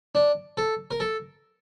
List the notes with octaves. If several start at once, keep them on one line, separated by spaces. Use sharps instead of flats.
D4
A4
A#4
A4